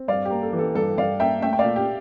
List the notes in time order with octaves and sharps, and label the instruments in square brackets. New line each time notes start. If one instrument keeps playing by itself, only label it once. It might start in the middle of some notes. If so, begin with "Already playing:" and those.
Already playing: [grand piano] C4
[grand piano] G2 [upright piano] D5 F5
[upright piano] G4
[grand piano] A#3
[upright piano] A4
[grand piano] E3
[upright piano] A4
[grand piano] G2 [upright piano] A4
[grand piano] G2 [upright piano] D5 F5
[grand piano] A#3 [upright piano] E5 G5
[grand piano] A3 [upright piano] E5 G5
[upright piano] G5
D5 F5
[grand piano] A#2
[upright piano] G4